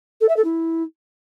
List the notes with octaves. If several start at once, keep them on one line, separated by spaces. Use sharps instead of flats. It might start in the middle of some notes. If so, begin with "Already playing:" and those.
A4
E5
A4
E4